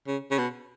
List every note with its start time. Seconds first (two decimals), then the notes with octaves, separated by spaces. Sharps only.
0.07 C#3
0.31 C#3
0.38 B2